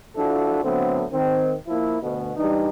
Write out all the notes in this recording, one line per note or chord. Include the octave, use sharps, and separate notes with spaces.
F3 D4 E4 F#4 A4
D3 F#3 A3 B3 C4
D#3 C4
F3 A#3 E4
D2 B2
E3 G3 D4 D#4